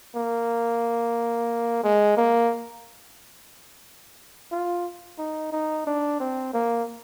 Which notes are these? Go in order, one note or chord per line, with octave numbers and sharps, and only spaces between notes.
A#3
G#3
A#3
F4
D#4
D#4
D4
C4
A#3